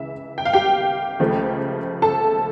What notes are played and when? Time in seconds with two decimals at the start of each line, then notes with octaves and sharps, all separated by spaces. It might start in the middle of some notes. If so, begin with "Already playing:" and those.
Already playing: C#2 C#3 E3 E5
0.38 G5
0.45 F5
0.53 G4 G5
1.20 C#2 C#3 F3 A3
2.02 A4 A5